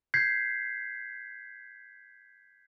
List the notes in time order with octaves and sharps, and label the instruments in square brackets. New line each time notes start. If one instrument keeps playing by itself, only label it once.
[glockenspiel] G6 G#6 B6 C7